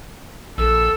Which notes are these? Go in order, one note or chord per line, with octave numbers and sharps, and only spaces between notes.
A#1 A4 E6